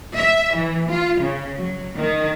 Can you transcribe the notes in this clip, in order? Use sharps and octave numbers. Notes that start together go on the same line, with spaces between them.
E5
E3
F4
C#3
F#3
D#3